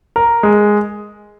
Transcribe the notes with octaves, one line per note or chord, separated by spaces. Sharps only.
A#4
G#3